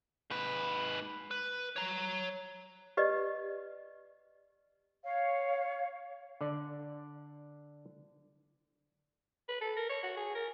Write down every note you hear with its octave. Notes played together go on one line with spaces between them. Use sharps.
G#2 B4
B4
C#5 A#5
G4 B4 D5 D#5
C#5 F5
D3 D5
B4
A4
A#4
C#5
F#4
G#4
A#4